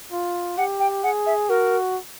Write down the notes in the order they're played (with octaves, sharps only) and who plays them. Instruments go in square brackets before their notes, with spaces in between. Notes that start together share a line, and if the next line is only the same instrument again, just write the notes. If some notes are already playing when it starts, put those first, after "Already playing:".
[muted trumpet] F4
[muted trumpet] G4 [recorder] F#5
[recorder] G5
[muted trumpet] G#4 [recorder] F#5
[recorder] E5
[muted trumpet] F#4 [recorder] A#4